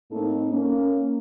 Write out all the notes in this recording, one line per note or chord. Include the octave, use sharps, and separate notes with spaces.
A2 A3 A#3 C4 D#4 A4
A#3 C#4